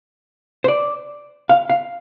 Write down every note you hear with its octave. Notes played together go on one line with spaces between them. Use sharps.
C5
D5
F5
F5